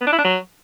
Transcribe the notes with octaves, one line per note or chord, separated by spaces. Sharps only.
B3
D4
E4
D4
F#3